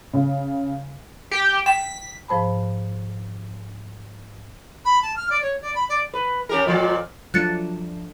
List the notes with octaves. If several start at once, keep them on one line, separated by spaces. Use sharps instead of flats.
C#3
G4 G5
G5 B6
G#2 F3 C5 A5 B5
B5
A5
F6
D5
C#5
D5
B5
D5
B4
C#4 G4 A#4
F2 A#2 F3
F3 F#3 A3 D4 F#6 A6 C#7